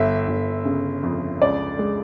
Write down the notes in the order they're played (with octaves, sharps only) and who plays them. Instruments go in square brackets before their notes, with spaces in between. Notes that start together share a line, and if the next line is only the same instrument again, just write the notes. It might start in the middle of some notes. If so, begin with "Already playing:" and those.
Already playing: [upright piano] G1 E5
G1
C#3
F2
C#2 D5
G#3